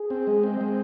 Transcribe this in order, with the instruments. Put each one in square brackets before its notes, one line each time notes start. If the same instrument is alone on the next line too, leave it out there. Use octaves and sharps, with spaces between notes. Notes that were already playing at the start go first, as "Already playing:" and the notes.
Already playing: [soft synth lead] G#4
[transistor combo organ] C4
G#3
C4
G#3